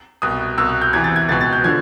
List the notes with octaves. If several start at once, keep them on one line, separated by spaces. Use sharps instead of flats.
C2 B2 D#6
C2 B2 E6
F#6
G6
E2 C3 E3 G#6
A6
G#6
C#2 B2 A6
A6
G6
D3 F3 G#6